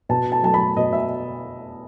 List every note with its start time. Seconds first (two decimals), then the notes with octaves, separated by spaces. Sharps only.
0.09 B2 A5
0.32 A5
0.43 F#3 A3 A5
0.54 B5
0.76 B2 D#5
0.93 E5